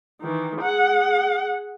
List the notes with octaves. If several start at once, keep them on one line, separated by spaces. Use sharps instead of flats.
D#3 E3
G#4 F#5